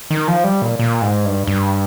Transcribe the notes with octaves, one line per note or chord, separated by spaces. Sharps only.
D#3
F3
G3
A#2
A#2
G#2
G2
G2